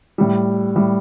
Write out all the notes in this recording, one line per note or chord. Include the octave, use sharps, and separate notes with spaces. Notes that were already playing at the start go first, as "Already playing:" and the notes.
A2 G3
A2 G3